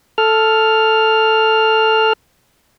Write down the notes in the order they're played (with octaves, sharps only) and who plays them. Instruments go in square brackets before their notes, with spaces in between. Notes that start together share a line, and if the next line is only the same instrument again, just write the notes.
[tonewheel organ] A4 F6